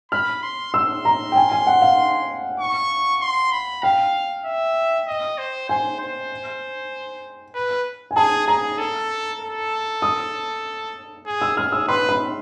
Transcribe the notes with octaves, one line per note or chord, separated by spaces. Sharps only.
B5 F6
C6
C6 E6
A#5
G5
G#5
G#5
F#5
F5
C#6
C6
B5
F5 G5
E5
D#5
C5
C5 G#5
C5
B4
G#5
G#4 A5
G#4 A#5
A4
A4
D#6
G#4
E6
G#4 F6
E6
B4 C6
B5